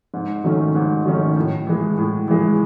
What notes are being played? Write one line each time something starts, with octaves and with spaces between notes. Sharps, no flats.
G#2
D#3 F#3 A3 C#4
G#2
D#3 F#3 A3 C#4
A2
E3 G#3
A2
E3 G#3